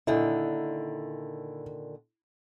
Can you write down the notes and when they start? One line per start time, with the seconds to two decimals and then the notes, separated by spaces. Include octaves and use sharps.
0.07 A#2 D3 D#3 E4